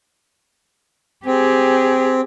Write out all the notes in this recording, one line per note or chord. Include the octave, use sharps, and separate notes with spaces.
C4 G4 G#4